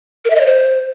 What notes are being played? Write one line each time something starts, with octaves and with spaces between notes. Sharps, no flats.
A#4
E5
D#5
C#5
C5